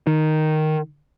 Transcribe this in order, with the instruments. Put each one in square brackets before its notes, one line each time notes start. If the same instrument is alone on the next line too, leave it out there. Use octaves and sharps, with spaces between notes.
[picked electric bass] D#3